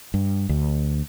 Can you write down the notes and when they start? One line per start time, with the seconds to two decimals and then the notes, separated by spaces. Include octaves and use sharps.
0.14 G2
0.49 D2